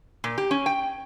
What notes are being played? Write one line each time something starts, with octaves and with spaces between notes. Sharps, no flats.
A#2
G4
C#4
G5